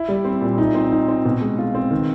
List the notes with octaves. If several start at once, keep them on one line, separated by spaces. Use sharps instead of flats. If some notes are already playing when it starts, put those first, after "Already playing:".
Already playing: E4
G3
C4
A#2
D#4
C4
D#4
C4
B2
G#3
F4
C4
D#3